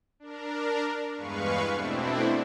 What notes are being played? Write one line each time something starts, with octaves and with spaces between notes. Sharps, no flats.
D4 A#4
E2 G2 G#3 B4 F5 C#6
B2 A3 C4 D4 E4